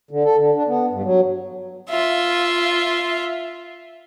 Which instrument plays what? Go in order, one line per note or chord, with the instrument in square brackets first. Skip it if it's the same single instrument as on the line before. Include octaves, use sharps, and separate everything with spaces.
[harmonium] D3
A4
D3
D4
B3
G2
F#3
[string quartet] F4 E5